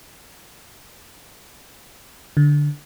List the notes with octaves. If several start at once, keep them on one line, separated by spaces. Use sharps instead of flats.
D3